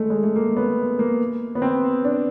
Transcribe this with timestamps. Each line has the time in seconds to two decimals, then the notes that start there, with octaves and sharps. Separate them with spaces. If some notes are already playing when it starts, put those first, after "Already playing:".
Already playing: G#3 A3
0.10 G#3
0.23 A3
0.36 A#3
0.57 B3
0.99 A#3
1.55 B3
1.62 C4
2.04 D4